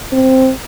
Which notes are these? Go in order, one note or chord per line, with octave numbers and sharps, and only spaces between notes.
C4